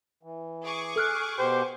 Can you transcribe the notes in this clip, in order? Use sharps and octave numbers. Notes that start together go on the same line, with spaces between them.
E3
G#4 C#6 D6
A4 F6 F#6
B2 G4 C5 G6